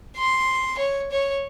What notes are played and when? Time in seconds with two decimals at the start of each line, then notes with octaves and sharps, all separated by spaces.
0.17 C6
0.78 C#5
1.11 C#5